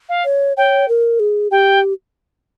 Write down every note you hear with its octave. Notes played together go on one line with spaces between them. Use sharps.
F5
C#5
C#5 G5
A#4
G#4
G4 G5